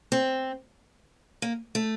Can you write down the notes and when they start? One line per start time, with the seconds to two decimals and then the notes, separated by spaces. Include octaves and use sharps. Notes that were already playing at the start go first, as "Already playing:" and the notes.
0.12 C4
1.42 A#3
1.75 A3